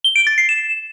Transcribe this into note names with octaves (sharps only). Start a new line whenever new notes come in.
G7
D7
A6
C7
E7